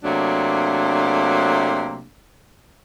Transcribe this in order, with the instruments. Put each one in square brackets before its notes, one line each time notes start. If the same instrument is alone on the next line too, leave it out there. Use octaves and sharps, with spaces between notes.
[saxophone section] C3 F#3 A3 A#3 D4